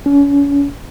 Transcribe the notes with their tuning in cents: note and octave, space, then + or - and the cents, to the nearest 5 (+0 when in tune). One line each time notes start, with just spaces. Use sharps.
C#4 +35